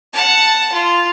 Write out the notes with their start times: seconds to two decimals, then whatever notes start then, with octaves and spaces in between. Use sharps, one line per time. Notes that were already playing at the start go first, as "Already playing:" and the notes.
0.13 F#5 A5
0.73 F4